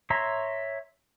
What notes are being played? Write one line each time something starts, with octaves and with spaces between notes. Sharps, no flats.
C#5 E5 A#5 C6